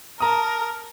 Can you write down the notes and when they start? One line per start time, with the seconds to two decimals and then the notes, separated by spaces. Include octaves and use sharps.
0.20 A#4 A5 A#5 D#6